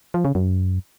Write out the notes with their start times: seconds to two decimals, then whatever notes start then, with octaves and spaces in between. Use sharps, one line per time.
0.14 F3
0.25 C#3
0.35 F#2